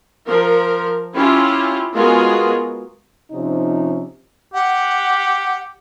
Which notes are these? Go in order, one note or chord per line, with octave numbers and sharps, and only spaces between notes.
F3 A#4
C#4 E4 F4 G4
G#3 B3 F4 F#4 G#4 A#4
C3 F3 C#4 D#4
G4 F#5